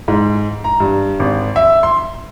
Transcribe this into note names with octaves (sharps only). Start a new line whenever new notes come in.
G#2
A#5
G2
G#1
E5
C6